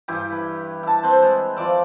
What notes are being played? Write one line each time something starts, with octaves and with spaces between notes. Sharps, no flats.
G2 E3 E4 G4
B4
E4 A5
C4 B4 C5
G#3
F3 D5 E5